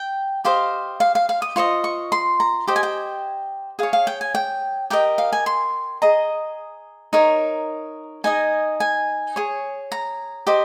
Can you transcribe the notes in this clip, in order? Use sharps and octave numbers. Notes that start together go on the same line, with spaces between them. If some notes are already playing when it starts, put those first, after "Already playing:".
Already playing: G5
G4 C5 D#5 F5
F5
F5
F5
D#6
F4 C5 D#5 C#6
C#6
C6
A#5
G4 C5 D#5 G5
G#5
G5
G#4 C#5 F5
F5
G5
G#5
G5
G4 A#4 D#5 G5
F5
G#5
C6
G#4 D#5 A#5
D#4 A#4 C#5
D#4 G#4 D#5 G#5
G#5
G#4 C#5
A#5
G4 C5 D#5